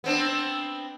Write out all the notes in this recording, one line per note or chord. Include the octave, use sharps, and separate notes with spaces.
B3 C4 D4